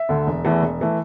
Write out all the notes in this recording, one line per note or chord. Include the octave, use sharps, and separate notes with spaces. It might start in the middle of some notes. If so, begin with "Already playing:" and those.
Already playing: E5
D2 D3
E1
E2 E3 A3
E1
E3 A3